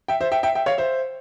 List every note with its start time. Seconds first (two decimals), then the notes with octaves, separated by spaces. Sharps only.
0.08 E5 G5
0.21 C5 E5
0.32 E5 G5
0.43 E5 G5
0.55 E5 G5
0.66 C#5 F5
0.78 C5 E5